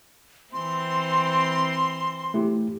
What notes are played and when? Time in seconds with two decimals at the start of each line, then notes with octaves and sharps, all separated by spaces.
0.53 E3 C4 C6
2.34 A3 E4 G4